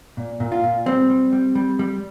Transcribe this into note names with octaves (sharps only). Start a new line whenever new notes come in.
A#2
A#2
F4
A#2
G3 C4
G3
G3
G3
G3